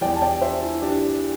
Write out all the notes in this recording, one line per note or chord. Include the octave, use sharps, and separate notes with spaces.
E2 E3 D5 G5
A5
D5 G5
C5 E5
E4
D4 G4